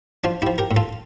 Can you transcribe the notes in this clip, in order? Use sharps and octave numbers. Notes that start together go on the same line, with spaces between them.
F3 D4 F4
F3 E4 G4
G4 A#4
A2
F4 A4